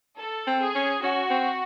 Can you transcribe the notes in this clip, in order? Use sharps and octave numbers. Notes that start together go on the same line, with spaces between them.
A4
C4
G#4
C#4
C#4 F#4
C4